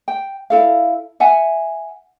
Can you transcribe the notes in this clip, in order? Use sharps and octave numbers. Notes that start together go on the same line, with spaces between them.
G5
E4 A4 F5
E5 F#5 G#5